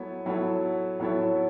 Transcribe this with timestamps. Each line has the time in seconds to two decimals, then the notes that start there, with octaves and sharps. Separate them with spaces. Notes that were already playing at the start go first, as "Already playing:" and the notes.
Already playing: F#3 B3 E4 A4 C#5
0.26 F#3 B3 E4 A4 C#5
1.00 F#3 B3 E4 A4 C#5